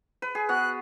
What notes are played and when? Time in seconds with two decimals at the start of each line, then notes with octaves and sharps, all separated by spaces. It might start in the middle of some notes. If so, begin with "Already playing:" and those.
0.22 B4
0.35 G#4
0.49 B3 F#4 F#6